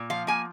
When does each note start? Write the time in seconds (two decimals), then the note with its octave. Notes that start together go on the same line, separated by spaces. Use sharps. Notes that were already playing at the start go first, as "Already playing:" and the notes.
Already playing: A#2
0.10 F3 F5
0.27 A#3 G#5